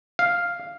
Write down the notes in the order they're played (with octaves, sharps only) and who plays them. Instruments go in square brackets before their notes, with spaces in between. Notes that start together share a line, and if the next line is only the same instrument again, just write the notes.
[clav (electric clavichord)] F5